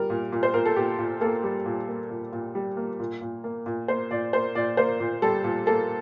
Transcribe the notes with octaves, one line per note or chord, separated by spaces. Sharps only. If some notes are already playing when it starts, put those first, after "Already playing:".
Already playing: G3 A#4
A#2
A#2
C5
A#2 A#4
A4
A#2 G4
A#2
A#3 A4
G3
A#2
A#3
A#2
A#2
G3
A#3
A#2
A#2
A#3
A#2
A#3 C5
A#2 D5
A#3 C5
A#2 D5
A#3 C5
A#2
G3 A4
A#2
A#3 A4